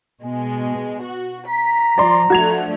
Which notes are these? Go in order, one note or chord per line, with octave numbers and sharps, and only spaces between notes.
B2 G#3
F#4
A#5 B6
F3 D5 C6
F3 A3 D4 F#4 G#6 F7